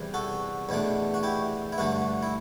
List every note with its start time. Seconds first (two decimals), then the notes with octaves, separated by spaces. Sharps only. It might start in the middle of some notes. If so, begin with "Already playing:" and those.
Already playing: E2 C3 E3 G3
0.14 F#4 A4
0.69 E2 B2 A3 D4
1.14 F#4
1.23 E4 G4
1.73 E4
1.78 G2 D3 A3 F#4
2.23 E4